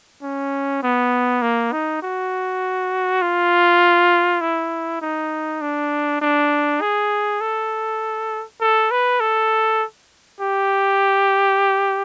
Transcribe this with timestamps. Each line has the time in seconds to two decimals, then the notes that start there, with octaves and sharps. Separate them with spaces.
0.22 C#4
0.83 B3
1.42 A#3
1.73 D#4
2.03 F#4
3.22 F4
4.41 E4
5.02 D#4
5.62 D4
6.22 D4
6.81 G#4
7.41 A4
8.61 A4
8.91 B4
9.21 A4
10.41 G4